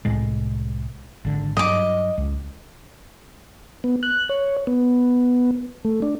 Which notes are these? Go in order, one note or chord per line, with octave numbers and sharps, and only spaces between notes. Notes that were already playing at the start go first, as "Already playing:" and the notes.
C2 A2 G#3
G#1 D3
G2 F#3 D#5 D6
C#2
B3
F#6
C#5
B3
A3
D4